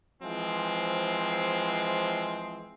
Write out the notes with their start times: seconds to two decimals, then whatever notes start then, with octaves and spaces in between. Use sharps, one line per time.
0.22 E3 F3 G#3 C4